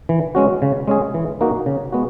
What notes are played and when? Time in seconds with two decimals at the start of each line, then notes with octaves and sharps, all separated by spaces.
0.09 E3
0.35 G#3 C#4 F#4
0.62 C#3
0.88 G#3 C#4 G#4
1.14 E3
1.41 A#3 D#4 F#4
1.66 C#3
1.92 G#3 B3 F#4